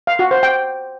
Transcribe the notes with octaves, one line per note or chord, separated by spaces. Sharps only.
F5
F#4
C5
G5